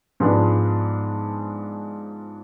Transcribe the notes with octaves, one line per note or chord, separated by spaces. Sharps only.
G#2 F3 G#3 B3 D4